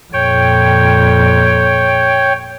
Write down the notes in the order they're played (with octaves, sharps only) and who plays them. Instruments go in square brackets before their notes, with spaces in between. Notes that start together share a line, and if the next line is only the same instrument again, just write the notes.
[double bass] F2 A#2 [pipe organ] C#5 G5